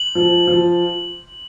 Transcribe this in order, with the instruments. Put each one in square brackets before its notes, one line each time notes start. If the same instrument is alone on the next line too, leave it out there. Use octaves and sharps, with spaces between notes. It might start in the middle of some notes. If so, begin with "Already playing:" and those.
Already playing: [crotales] F#7
[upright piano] F3
F3